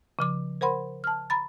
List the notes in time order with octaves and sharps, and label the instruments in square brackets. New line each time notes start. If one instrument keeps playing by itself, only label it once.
[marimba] C#3 F3 D6
A#4 C5 F#5 B5 C6
A5 F6
A#5 B5 A6